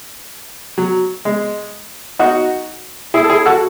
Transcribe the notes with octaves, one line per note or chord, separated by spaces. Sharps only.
F#3
G#3
D#4 F#4
E4 G#4
A4
E4 G#4
F#4 A4